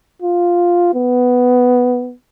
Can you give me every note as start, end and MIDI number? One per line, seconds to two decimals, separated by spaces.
0.22 0.93 65
0.94 2.13 59